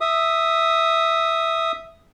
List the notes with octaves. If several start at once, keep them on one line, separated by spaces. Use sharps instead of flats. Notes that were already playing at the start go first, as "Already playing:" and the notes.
E5 D#6